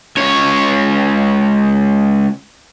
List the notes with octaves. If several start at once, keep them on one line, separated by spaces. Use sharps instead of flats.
C#2 C#5